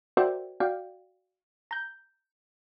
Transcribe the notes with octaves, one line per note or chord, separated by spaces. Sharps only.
F#4 A#4 C5 D5 E5 G5
F#4 D5 F5 G5
A#5 G6